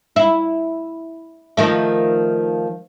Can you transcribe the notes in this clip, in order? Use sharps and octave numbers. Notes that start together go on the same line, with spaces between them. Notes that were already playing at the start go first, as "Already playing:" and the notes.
E4
D#3 F3 A3